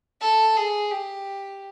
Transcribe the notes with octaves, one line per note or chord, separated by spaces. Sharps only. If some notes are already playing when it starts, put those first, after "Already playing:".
A4
G#4
G4